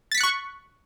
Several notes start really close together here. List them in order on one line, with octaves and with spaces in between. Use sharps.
A6 B6 C#7 F#6 C#6